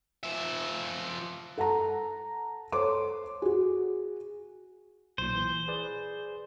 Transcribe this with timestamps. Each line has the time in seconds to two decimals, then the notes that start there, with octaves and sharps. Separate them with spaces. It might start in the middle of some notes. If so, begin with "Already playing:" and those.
0.24 F3 E5
1.57 A4 F#5 A5 A#5
2.72 A4 C5 C#5 C6 D6
3.42 F#4 G#4
5.18 B1 A#2 C5
5.35 E3
5.68 G#4 B4 D5